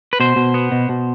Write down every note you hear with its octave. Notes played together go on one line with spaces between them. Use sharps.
B4
B2 C5
B2
B3
B2
B2